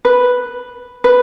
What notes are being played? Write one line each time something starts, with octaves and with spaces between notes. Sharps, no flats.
B4
B4